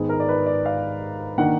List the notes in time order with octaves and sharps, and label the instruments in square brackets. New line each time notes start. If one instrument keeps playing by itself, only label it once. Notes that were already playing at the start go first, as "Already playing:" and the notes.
Already playing: [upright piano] G#2 D#3 G#3 B3 G#4
A#4
D5
B4
D5
F5
D#3 A#3 D4 F#5